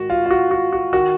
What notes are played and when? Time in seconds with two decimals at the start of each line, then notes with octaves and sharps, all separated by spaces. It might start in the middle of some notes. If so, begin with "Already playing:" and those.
Already playing: G#2 D#3 F#4
0.10 F4
0.26 F4
0.31 F#4
0.51 F#4
0.73 F#4
0.93 D#3 F#4